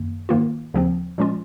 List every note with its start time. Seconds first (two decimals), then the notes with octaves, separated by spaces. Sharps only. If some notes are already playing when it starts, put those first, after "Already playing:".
Already playing: F#2 D#3 A#3
0.29 G#2 D#3 A#3 F4
0.74 D#2 C#3 F3 C4
1.18 A#2 F3 G#3 C#4 F4